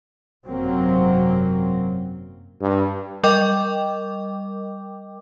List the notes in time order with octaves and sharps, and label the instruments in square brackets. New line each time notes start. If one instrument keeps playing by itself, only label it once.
[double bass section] G#1 F#2 C3 F#3 A#3 C4
[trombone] G2
[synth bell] G3 A#4 D#5 G5 D6